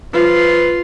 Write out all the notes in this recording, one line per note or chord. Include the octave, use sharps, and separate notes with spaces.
F3 F4 B4